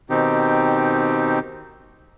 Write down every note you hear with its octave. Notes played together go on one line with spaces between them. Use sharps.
B2 D#3 C4 D#4 G4